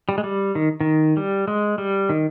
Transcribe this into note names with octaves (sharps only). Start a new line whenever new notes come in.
G3
G#3
G3
D#3
D#3
G3
G#3
G3
D#3